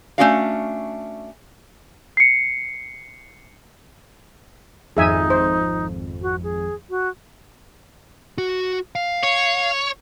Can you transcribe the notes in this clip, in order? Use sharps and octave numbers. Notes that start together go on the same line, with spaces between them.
A3 A#3 C#4 D4 F#4 F5
C7 C#7
G#1 F2 D#4 G#4 E5 G#5
C5
F#4
G#4
F#4
F#4
F5
C#5